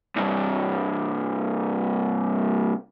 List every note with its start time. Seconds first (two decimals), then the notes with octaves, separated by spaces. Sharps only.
0.16 C2 G2